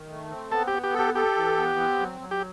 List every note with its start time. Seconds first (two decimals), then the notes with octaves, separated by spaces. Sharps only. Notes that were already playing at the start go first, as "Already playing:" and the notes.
Already playing: D#3
0.09 A3
0.30 C4
0.51 B3 A4
0.67 B3 G4
0.83 G4
0.94 A4
0.99 G4
1.15 G4 A4
1.37 E3
1.57 B3
1.79 C4
2.00 F#3
2.21 F#3
2.31 G4